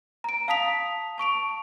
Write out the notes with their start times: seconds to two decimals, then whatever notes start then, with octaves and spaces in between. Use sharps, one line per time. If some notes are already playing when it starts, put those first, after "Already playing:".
0.24 A#5 D7
0.48 F5 A5 D#6 B6 F7
1.18 A5 C#6 D7 F7